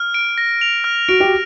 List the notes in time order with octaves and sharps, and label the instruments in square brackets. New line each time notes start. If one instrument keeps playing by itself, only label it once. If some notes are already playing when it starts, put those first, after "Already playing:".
Already playing: [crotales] F6
D7
A#6
F7
F6
[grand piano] F#4 [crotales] D7
[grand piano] G4